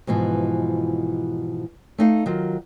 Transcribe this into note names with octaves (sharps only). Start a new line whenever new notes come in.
G#2 B2 E3 F3
A3 D#4 F5
D#3 F#3 F4